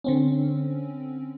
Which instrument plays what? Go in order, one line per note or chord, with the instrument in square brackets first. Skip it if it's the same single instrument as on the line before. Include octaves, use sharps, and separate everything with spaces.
[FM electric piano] D3 C4 C#4